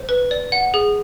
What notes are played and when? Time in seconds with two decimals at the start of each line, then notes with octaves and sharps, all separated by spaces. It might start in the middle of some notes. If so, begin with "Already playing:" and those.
Already playing: C5
0.09 B4
0.31 D5
0.52 F#5
0.74 G#4